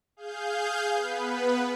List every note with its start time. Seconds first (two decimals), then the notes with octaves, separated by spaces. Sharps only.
0.17 G#4 F5 G6
0.93 B3 B4